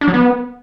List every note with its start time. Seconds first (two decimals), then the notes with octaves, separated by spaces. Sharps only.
0.01 D4
0.08 F#3
0.14 B3